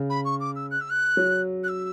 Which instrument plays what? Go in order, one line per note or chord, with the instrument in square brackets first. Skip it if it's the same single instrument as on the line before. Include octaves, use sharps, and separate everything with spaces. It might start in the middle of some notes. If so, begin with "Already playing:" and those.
Already playing: [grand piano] C#3
[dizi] B5
C#6
D6
E6
F#6
E6
F#6
[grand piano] F#3
[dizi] F#6
E6